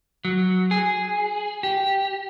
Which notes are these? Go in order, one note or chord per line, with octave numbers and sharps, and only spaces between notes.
F#3
G#4
G4